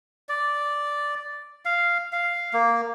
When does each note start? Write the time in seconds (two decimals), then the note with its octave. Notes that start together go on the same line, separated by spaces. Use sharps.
0.29 D5
1.65 F5
2.13 F5
2.53 A#3